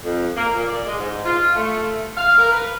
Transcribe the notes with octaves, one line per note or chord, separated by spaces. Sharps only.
F2
A#3
A#2
D5
G#3
G#2
F4
A3
F5
A#4
B4